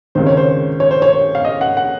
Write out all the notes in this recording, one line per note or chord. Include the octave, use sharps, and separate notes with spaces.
C#2 C3 D#3 C5
C#5
C5
C#5
C5
C#5
F5
D#5
F#5
F#5